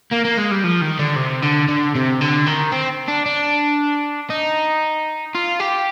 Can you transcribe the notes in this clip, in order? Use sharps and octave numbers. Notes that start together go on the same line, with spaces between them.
A#3
A#3
G#3
G3
F3
D#3
D3
C3
D3
D3
C3
D3
D#3
C4
D4
D4
D#4
F4
G4